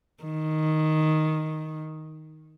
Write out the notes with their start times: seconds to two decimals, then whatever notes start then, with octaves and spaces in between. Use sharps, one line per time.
0.24 D#3